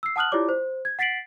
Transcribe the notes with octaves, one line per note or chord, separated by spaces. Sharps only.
E6 C7
F#5 A5 D#6 F6 F#6 F#7
E4 F4 G4 C#5 D5 D6
C5
G#6
F#5 A6 B6 C7 D7 F#7